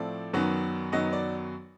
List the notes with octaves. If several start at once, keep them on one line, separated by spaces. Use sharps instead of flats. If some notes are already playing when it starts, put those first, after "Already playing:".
Already playing: A2 F3 A3 C4 D5
F#2 D#3 F#3 B3
F#2 D#3 F#3 B3 D#5
D5